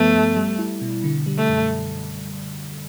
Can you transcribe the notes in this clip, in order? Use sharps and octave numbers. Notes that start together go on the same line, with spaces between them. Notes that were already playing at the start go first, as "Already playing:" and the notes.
Already playing: G2 F3 A3 B3
G2
G3
E4
B2
D3
G3
A3
F#2